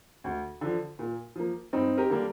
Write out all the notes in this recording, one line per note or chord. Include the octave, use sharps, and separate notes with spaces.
D2
D3 F3
A#2
F3 A#3
G2 C4 D#4
G4 A#4
D3 G3 A#3